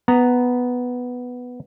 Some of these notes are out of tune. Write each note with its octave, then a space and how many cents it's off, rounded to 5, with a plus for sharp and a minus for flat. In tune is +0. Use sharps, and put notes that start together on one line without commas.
B3 +0 A#5 +0